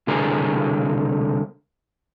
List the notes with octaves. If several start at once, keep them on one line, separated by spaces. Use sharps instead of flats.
C2 B2 D3 G#4 A#4